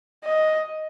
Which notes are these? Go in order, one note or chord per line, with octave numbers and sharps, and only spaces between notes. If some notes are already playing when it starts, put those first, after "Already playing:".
D#5